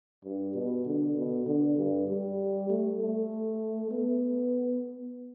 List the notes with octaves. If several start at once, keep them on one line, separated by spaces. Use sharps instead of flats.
G2
B2
D3
B2
D3
G2
G3
A3
A3
B3